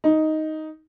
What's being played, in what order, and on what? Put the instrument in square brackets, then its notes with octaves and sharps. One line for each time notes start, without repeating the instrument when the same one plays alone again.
[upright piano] D#4